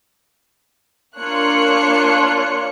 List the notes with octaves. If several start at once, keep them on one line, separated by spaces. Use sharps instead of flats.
A#3 D4 F4 C#5 F#6 C#7